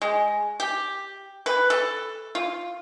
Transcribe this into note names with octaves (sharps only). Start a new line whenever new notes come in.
G#3
G4
B4
A4
F4